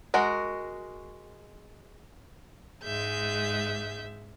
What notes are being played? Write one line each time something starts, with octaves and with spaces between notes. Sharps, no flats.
G#3 F#4 A#4
G#2 G#3 E5 G6